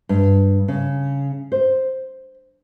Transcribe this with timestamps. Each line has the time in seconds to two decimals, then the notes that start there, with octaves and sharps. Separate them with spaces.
0.09 G2
0.68 C#3
1.52 C5